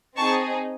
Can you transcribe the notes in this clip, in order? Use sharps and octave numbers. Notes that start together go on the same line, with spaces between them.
C4 D#4 G#4 A5 C#6